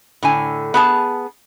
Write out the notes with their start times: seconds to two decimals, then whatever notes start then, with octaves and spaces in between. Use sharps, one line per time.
0.23 A2 D3 G#5
0.74 B3 G#4 A5